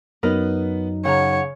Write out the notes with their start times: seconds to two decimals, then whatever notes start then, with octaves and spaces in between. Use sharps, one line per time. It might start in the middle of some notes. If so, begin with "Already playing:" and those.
0.23 F#2 F#3 B3 D#4 A#4 B4
1.05 C#3 C#5 F#5 A#5